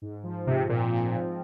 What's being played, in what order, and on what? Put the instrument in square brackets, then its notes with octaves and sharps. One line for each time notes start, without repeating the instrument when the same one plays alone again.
[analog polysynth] G#2
F3
[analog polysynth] G#2 [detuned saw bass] C3
[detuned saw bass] A#2 [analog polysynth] C4
[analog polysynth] G#2
F3